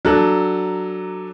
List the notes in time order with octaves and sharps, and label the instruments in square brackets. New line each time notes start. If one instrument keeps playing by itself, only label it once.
[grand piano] F#3 D4 A4 F#6